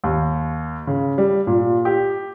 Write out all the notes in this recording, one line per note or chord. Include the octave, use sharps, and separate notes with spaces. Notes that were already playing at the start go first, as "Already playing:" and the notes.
D#2
C#3
G3
A#2
G4